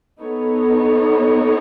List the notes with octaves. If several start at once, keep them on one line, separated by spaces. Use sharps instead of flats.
B3 D#4 A4 C#5